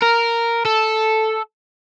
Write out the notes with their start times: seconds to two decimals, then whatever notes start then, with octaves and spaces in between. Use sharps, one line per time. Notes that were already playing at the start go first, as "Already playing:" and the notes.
0.02 A#4
0.65 A4